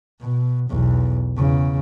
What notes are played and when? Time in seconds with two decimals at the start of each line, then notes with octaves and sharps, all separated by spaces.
0.21 B2
0.70 B1 E2
1.36 E2 C#3